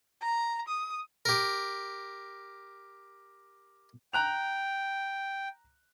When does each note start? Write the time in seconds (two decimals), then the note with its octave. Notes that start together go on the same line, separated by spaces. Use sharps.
0.22 A#5
0.68 D#6
1.25 G4 A#4
4.13 G5 A#5 F#6 F7